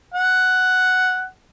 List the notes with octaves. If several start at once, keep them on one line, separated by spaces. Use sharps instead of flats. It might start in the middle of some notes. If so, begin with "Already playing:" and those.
F#5